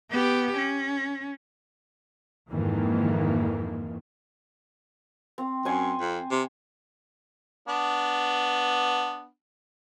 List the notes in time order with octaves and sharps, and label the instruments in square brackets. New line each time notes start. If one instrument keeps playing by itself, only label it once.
[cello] B3 G4
C#4
[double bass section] F2 G#2 D#3 E3 A#3
[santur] C4
[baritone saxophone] F#2 [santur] C5 G#5
[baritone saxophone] F2
C3
[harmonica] B3 D4